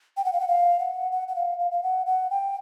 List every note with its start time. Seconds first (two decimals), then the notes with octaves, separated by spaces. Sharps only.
0.17 G5
0.25 F#5
0.33 F5
0.40 F#5
0.48 F5
0.80 F#5
1.12 F#5
1.28 F#5
1.36 F5
1.59 F5
1.71 F5
1.83 F#5
2.06 F#5
2.31 G5